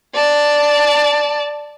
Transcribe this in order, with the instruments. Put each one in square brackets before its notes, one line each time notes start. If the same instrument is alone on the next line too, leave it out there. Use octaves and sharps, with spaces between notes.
[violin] D5 A5